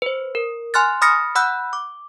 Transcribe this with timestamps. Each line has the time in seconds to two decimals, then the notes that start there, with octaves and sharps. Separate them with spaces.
0.02 B4 C5
0.35 A#4
0.74 G#5 C6 F6 F#6 A6
1.02 B5 D#6 F6 A6 A#6 C#7
1.35 F#5 B5 E6 F#6 G6
1.73 D6